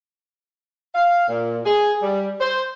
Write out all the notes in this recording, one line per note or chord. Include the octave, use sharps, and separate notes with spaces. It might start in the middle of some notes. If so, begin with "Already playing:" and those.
F5
A#2
G#4
G3
C5